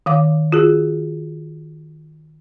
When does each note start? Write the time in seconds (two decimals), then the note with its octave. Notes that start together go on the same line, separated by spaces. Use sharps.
0.06 D#3 F5 D6
0.52 F4 F#4 G#4